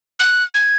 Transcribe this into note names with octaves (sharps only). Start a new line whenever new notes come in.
F#6
G#6